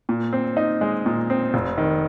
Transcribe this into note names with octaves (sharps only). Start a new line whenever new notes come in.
A#2
C4
D#4
G#3
A#2
C4
F1
D#3